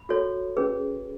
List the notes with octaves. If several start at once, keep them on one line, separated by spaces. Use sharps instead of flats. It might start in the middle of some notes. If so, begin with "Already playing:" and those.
Already playing: B5
F#4 A4 C#5
C#4 G#4 B4